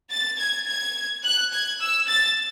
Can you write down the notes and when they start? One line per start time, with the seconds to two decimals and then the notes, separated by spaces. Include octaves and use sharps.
0.11 A6
0.39 G#6
0.67 G#6
1.24 F#6
1.52 G#6
1.80 E6
2.08 A6